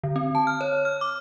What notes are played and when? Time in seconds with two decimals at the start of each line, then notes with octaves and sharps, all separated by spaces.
0.03 D3
0.16 C4
0.35 A5
0.47 F6
0.61 C#5
0.85 F6
1.01 D6